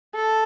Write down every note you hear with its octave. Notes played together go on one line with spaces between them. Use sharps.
A4